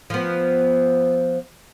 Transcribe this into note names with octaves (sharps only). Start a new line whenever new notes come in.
F3 B3